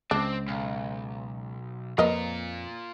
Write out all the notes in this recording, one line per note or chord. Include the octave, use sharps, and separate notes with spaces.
C#2 C4 D4
B1
F2 A#3 F4 A#4 B4 D#5 A#5